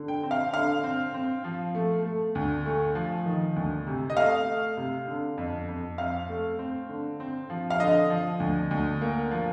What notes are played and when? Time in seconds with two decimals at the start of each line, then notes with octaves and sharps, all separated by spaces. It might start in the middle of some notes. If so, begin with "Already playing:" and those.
Already playing: D3
0.08 G5
0.23 C4
0.31 F5
0.53 D3 F5
0.84 C4
1.14 C4
1.44 F3
1.75 A3
2.05 A3
2.35 D2
2.66 A3
2.95 F3
3.25 D#3
3.56 D2
3.87 C3
4.10 D#5
4.16 A3 F5
4.47 A3
4.77 C3
5.08 D3
5.38 F2
5.68 F2
5.98 C4 F5
6.29 A3
6.59 C4
6.89 D3
7.20 C4
7.50 F3
7.70 F5
7.80 D3 D#5
8.10 F3
8.40 D2
8.71 D2
9.01 A#3
9.31 F3